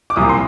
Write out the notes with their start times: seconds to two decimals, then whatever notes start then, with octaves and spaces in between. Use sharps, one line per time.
0.10 D6
0.16 C2 A#2 F3 D#6
0.29 C6